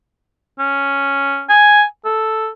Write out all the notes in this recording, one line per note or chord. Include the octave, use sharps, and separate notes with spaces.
C#4
G#5
A4